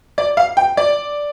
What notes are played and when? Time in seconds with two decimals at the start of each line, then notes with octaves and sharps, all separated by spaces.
0.18 D5
0.37 F5
0.57 G5
0.77 D5